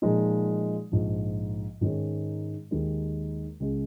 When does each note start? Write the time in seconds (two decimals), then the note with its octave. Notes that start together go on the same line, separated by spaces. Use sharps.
0.02 A#2 F3 G#3 D#4
0.92 A#1 G#2 F3
1.81 G#2 D#3 G#3 C#4
2.71 D#2 D#3 G#3
3.60 C#2 C#3 G#3